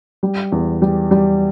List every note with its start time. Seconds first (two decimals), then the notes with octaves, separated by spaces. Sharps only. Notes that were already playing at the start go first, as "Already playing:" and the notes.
0.23 G3
0.52 E2
0.82 G3
1.11 G3